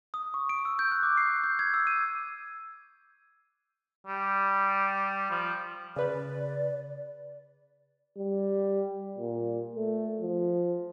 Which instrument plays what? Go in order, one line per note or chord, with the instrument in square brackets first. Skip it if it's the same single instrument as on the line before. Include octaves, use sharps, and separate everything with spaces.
[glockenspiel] D#6
C#6
D7
E6
G6
F#6
D6
C7
G6
G#6
E6
D#7
[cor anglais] G3
F3
[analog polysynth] C#3 B4 [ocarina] D5
[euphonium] G3
A#2
A3
F3